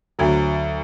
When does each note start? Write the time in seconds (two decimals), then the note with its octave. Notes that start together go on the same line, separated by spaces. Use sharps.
0.19 D2 F#3